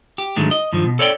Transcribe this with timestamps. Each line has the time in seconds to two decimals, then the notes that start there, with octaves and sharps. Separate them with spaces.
0.18 G4
0.36 G#2 D3 D#3 F#3 G#3 A3
0.51 D#5
0.73 G2 D#3 F3
0.86 B2
0.99 A4 C#5 D5 F5 G5